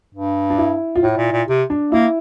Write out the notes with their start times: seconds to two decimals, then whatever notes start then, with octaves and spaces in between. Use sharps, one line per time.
0.15 G2
0.50 D4
0.58 E4
0.96 F4
1.03 A2 E4
1.17 A#2
1.32 A#2
1.48 C3
1.70 D4
1.91 A#3 E4